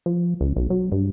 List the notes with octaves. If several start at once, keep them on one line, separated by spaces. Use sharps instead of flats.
F3
C#2
B1
F#3
G2